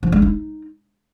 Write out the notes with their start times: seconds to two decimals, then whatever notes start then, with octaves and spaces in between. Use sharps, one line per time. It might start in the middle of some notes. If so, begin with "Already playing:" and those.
0.03 F3
0.12 G#3
0.22 D#4